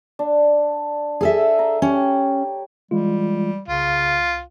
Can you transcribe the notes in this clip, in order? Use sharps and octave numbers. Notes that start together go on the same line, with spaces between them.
D4
G#4 A4 E5
A#5
C#4 G4 C#5
E3 G3 G#3 F4
C2 C#3 F4